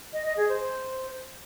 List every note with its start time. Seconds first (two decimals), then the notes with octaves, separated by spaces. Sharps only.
0.13 D#5
0.25 D#5
0.37 G#4
0.49 C5